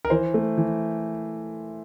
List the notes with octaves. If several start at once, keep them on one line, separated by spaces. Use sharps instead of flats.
A#4
E3 C5
A3
E3